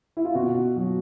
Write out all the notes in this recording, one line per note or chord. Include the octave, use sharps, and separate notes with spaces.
E4
F4
B2 F#4
F#3